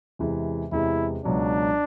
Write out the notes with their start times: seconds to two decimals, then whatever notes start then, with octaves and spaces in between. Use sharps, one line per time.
0.19 E2 C3 E3 G#3
0.72 E2 C3 E3 G#3 E4
1.25 C#2 B2 F#3 D4